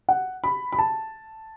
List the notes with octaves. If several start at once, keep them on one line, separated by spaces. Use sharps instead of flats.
F#5
B5
B5
A5